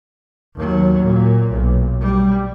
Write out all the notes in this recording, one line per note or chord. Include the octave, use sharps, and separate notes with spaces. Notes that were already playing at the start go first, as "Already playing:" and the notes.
D#2 F#3
A#2
B1
G3